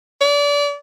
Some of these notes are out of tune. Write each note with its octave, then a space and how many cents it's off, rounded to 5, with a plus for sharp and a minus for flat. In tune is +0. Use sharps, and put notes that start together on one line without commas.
D5 -30